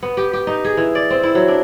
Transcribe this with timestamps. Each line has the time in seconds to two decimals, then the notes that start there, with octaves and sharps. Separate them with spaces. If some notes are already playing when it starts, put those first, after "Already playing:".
0.03 B3
0.17 G4
0.33 G4
0.47 D#4
0.65 G#4
0.77 E3
0.95 D5
1.10 C4
1.23 E4
1.35 F#3
1.48 D4